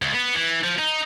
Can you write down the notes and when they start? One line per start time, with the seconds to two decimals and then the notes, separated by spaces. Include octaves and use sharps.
0.02 C#2
0.14 B3
0.35 E3
0.64 F3
0.79 D#4